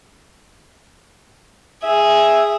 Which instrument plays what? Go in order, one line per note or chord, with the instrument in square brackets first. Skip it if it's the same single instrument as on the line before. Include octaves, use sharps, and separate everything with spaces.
[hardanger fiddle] G#4 [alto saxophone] E5